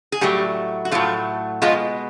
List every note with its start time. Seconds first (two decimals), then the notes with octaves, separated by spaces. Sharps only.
0.12 G#4
0.21 A2 F#3 G3 A3 G4
0.85 F#4
0.91 A2 F3 F#3 A3 F4
1.62 B2 F3 G#3 F4